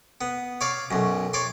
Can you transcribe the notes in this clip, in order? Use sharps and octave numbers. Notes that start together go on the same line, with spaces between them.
B3
C#5 D5 F5
B1 F#2
C#5 D5 C6